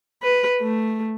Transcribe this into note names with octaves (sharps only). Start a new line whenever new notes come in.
B4
A3